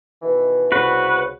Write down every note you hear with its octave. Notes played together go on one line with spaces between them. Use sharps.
B2 D#3 E3
C2 C#3 F#4 B4